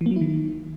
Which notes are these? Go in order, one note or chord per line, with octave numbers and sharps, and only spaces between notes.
E3
A#3
F#3
E4
D#3